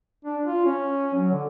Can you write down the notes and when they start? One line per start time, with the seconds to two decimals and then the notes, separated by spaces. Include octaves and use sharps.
0.25 D4
0.45 F4
0.65 C#4
1.15 F#3
1.32 D3